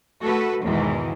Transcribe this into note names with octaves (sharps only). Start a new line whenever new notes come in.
A3 F#4 A4 B4
E2 G#2 B2 D#3 E3